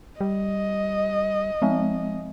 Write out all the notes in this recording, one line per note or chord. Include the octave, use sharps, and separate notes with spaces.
G3 D#5
F3 G#3 C4